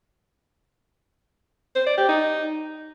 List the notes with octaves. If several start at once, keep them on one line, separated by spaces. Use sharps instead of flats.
C5
D5
G4
D#4